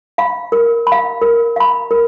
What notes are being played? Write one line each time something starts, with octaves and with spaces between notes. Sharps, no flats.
F5 B5
A#4
B5
F5
A#4
F5 B5
A#4